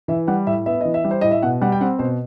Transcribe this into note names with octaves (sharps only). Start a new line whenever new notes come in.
E3 E5
G3 F#5
A2 E5
B3 E5
E3 D#5
E5
G3
C5
A2 D#5
E5
B2 F#5
G3 F#5
G5
C4 F#5
B2 C5